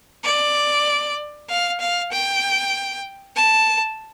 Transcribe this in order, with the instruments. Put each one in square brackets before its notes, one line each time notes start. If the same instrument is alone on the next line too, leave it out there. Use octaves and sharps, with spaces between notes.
[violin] D5
F5
F5
G5
A5